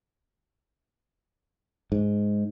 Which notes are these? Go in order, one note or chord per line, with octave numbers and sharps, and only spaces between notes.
G#2